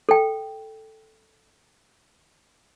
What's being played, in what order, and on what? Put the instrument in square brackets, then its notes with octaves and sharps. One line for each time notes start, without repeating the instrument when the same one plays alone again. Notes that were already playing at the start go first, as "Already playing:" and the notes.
[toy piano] A4 G5